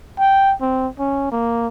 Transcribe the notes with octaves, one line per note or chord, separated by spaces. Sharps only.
G5
C4
C#4
A#3